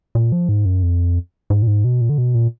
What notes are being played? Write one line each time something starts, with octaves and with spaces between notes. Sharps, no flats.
A#2
F3
G#2
F#2
F2
G#2
A#2
G#2
B2
A#2
D3
B2
A#2